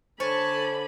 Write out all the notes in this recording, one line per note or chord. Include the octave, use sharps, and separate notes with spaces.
D3 C5 C#5 G#5 A5 B5